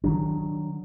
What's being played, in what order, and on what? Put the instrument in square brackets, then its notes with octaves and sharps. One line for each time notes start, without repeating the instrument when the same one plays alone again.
[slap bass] D#3 F#3 D4